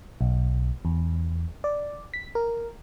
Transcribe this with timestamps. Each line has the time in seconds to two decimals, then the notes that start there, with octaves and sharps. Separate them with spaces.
0.21 B1
0.85 E2
1.64 D5
2.14 B6
2.35 A#4